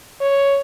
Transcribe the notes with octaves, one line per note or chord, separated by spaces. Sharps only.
C#5